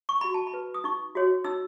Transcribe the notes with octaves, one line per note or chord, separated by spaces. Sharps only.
C#6
F#4 B5
A5
B5
B4
D#6
D#4 C#6
F#4 C#5
D#4 E6